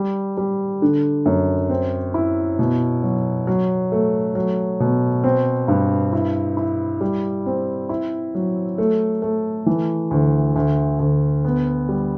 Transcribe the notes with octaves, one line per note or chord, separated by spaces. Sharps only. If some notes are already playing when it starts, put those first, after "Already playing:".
Already playing: G3
G3
D3
F#2
C4
E4
B2
F#3
F#3
A3
F#3
B2
C4
G2
E4
E4
G3
C4
E4
F#3
A3
A3
E3
D2
D2
D2
B3
G3